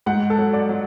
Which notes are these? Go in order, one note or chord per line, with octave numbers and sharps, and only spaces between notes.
G#2 F#5
A4
F#3
D5
F#3